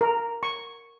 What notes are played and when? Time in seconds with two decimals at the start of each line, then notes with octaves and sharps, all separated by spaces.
0.01 A#4
0.43 C#6